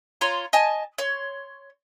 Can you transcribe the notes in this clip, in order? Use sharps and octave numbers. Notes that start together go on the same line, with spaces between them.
F4 C#5 A#5 C6
D#5 G#5 A5
C#5 C6